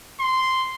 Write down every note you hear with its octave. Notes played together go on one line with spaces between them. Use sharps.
C6